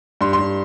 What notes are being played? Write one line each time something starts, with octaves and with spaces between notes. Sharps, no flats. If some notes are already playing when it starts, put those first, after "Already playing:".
G2 C6
C6
G2